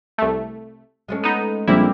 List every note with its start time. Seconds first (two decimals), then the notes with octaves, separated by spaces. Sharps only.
0.18 C2 A3
1.08 G#3 A3 C#4
1.23 B3 D#4 D#7
1.67 A#1 G3 A#3 C4 E4